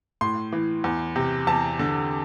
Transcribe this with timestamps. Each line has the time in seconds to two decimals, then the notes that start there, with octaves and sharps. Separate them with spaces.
0.21 A2 C6
0.52 E3
0.84 E2
1.16 C3
1.47 E2 A5
1.79 D3